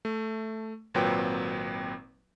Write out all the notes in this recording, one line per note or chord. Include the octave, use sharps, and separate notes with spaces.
A3
G#1 A#2 F#3 C4 B4 G5